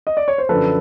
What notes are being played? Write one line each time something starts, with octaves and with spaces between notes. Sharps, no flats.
D#5
D5
C#5
C5
F#2 D3 F3 A4 B4